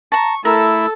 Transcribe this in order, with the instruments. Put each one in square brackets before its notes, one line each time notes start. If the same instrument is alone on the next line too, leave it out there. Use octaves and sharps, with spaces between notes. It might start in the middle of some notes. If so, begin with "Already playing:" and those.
[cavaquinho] A5 A#5 [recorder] C#6
[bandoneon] A3 E4 [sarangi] A4 [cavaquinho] A#4 [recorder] E6